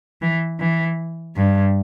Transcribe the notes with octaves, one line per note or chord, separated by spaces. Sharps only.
E3
E3
G2